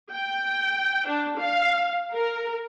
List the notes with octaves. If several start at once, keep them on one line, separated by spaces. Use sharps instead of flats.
G5
D4
F5
A#4